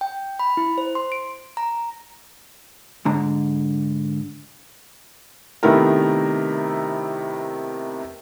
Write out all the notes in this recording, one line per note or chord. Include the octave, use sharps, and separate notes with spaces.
G5
B5
E4
C5
C6
D7
A#5
G#2 D3 A#5
C3 D#3 A3 B3 E4 A#4